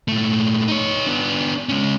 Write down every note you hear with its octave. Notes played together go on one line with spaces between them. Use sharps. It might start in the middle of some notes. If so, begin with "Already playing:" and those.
A#2 A3
D#4 C#5
B3 D4
G#3 C#4